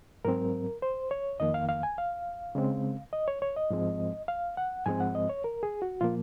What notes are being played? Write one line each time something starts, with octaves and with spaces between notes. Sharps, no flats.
G#2 F#3 C4 A#4
C5
C#5
F2 D#3 A#3 D#5
F5
F5
G#5
F5
C#3 G#3 C4
D#5
C#5
C#5
D#5
G#2 F3 G#3 C4
F5
F#5
G#2 F3 G#3 C4 G#5
F#5
D#5
C#5
A#4
G#4
F#4
A#2 F3 A#3 F4